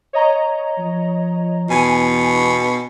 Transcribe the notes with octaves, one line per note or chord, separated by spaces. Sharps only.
C#5 D#5 A#5
F3
E2 B2 G#5